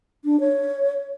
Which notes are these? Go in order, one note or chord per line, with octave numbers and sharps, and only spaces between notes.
D4
C#5